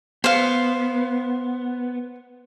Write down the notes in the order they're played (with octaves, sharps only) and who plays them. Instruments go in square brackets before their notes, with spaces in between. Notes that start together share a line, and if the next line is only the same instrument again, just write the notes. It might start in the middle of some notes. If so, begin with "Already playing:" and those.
[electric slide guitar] B3 [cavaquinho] C5 F5